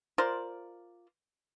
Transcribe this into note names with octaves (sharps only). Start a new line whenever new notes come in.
F4 A#4 C5 D5